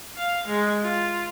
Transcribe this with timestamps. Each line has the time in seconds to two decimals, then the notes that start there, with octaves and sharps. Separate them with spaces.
0.16 F5
0.47 G#3
0.82 F4